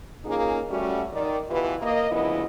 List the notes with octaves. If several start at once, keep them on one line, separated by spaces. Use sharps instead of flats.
A#3 C#4 D#4 F4 G#4
G3 A3 C#4 F#4
D#3 D5
B2 E3 F4 G4 B4
A#3 D#5
D2 C#3 F3 B3 E4 D#5